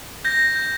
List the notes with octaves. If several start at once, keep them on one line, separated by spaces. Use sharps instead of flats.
G6 A#6
G6